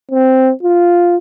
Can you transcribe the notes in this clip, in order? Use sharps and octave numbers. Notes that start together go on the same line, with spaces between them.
C4
F4